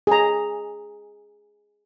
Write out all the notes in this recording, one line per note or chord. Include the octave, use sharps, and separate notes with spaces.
G#4 A#5